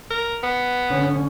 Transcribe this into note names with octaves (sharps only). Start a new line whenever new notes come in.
A#4
B3
D3 C#4